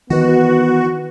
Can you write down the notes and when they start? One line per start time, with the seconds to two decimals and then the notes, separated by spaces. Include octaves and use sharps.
0.10 D#3 E3 B3 F#4